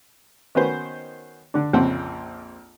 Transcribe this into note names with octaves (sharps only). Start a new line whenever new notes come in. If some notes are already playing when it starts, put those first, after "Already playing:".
D#3 B3 C#4 F#4 B4 C5
D3 D4
A#1 F2 C#3 C4 F#5